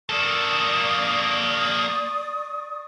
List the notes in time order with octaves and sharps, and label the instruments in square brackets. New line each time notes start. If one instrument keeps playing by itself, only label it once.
[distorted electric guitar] A#3 A4 [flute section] D5 C#6 D#6